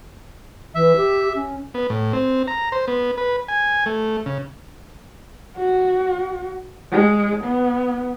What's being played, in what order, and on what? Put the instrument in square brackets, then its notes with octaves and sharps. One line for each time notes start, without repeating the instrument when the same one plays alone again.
[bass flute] E3 [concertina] E5
[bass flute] G4
C#4
[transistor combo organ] B3
A2
C4
A#5
C5
B3
B4
G#5
A3
C#3
[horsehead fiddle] F#4
G#3
B3